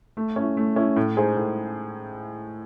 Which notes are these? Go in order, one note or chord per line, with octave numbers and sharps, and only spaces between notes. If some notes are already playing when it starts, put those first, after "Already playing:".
A3
C#4 E4
A3
C#4 E4
A2
G#3 D#4 G#4 C5
A2